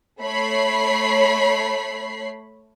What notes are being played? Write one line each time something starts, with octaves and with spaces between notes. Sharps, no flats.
A3 C#5 B5 C7